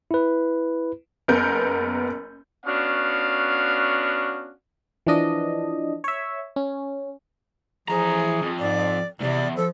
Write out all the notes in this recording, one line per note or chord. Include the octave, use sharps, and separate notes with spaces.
E4 B4
F#1 B3 A#4 G6
B3 C#4 D4 F#4 F5
E3 F3 D4 D#5
C#5 E5
C#4
E3 F3 G#4 A#5
F2
G#2 D5
E2 G#2 C3 D5
F3 A4